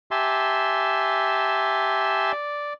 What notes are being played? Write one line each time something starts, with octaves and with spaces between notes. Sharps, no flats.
G4 E5 G#5 A5 C6
D5